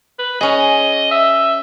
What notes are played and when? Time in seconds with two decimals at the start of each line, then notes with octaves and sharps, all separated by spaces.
0.19 B4
0.41 C#4 G#4 D#5
1.11 E5